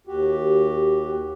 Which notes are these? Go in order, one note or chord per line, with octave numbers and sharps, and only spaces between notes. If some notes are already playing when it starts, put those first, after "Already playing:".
D#2 F#4 G4